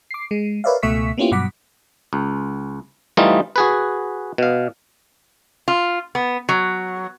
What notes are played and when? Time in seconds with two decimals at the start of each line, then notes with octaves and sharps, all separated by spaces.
0.11 D6 C7
0.31 G#3
0.64 A#4 B4 C#5 D5 E5 F5
0.83 C#2 B2 A3 E5 C#6 B6
1.18 A#3 B3 C#4 E4 F4 G4
1.31 G2 B2 F#3 F#5 D6 B6
2.13 C#2
3.17 E3 G3 A3 D#4 F4
3.56 F#4 G#4 B4
4.38 B2 F5
5.68 F4
6.15 B3
6.49 F#3